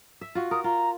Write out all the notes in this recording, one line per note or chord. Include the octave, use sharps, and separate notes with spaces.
E5
F4 F#4
A#4 D#6
F4 A#5